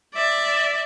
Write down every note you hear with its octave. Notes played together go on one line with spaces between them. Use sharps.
D5 E5